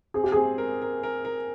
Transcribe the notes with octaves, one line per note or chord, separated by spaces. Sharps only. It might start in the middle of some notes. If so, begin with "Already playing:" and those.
C4 G#4
G4
C4 G#4
A#4
A#4
A#4
A#4